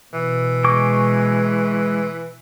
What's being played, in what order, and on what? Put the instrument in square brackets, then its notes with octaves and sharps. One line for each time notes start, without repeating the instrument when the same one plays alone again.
[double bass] B2 [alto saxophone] E3
[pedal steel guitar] G#3 C#6 D6